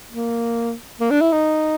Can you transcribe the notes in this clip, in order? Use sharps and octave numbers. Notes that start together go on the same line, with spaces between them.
A#3
A#3
D4
E4
D#4